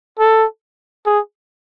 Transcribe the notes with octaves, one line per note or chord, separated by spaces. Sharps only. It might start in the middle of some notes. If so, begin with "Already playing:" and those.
A4
G#4